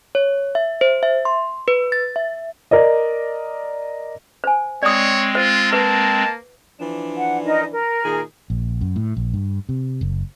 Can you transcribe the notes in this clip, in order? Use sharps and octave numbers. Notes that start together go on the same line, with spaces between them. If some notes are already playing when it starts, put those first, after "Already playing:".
C#5
E5
C5
E5
C6
B4
A6
E5
A#4 D5 D#5
C5 G#5
G#3 C4 C#5 D5 D#6
F4 C5
A#3 B4 A5
E3 F3 D4
F#5
D#4 A#4 D#5
A#4
A#2 D#3 G#4
A#1
F#2
A2
A#1
G2
C3
F#1